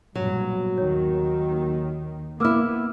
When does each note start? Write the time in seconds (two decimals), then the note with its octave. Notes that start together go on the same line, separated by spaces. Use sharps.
0.15 A#1 G2 B2 F#3
0.78 D#2 D#3 C#5
2.40 A#3 B3 E4 D6 E6 F6